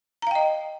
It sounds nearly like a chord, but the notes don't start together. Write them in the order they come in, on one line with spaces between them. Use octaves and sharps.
A#5 F5 G5 D#5